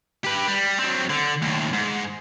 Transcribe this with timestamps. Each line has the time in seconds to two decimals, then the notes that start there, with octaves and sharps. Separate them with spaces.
0.24 G4 B4
0.48 G3
0.79 F#3 C4
1.10 D3
1.42 D#2 A2
1.73 G#2